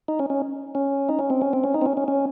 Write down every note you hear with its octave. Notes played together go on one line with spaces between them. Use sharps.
D#4
C#4
C#4
C#4
D#4
C#4
C4
C#4
C4
C#4
D#4
C4
C#4
C#4
C#4